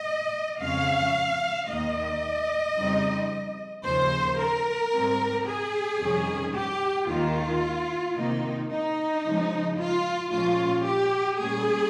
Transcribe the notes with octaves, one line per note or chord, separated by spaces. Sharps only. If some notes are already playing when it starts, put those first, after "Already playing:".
Already playing: D#5
F2 C#3 G#3 C#4 F5
D#2 D#3 A#3 D#5
F2 C#3 G3 C4 D#4
D#2 C#3 F3 C5
A#4
G#2 G3 C4
G#4
F2 C3 D#3 G3 C#4
G4
D#2 D#3 G#3 F4
C3 D#3 A#3 D#4
D#4
C#3 F3 G#3
F4
A#2 F3 G#3 C#4 F4
G4
A#2 G3 A#3 C#4 G#4